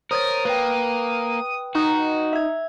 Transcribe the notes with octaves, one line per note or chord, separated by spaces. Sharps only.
A#4 C5 C#5 D#6 A6
A#3 B4 G5
D#4 F#4
E5 G#6